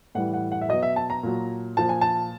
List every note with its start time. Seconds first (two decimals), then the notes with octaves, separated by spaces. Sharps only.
0.15 A2 E3 G3 F#5
0.34 F#5
0.52 F#5
0.61 E5
0.69 B2 F#3 D#5
0.83 E5
0.96 A5
1.10 A#5
1.23 A#2 F#3
1.77 A#2 F3 A5
1.89 G#5
2.01 A5